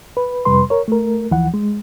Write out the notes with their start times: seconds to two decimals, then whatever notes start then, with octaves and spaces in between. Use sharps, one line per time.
0.17 B4
0.45 F2 C3 G3 B4 C6
0.70 A#4 C#5
0.88 A3 A#4
1.31 D2 E3 F3 F#5
1.54 G#3